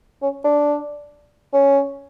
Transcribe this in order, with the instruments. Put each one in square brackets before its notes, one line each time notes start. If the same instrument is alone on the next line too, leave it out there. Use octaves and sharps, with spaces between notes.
[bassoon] C#4
D4
C#4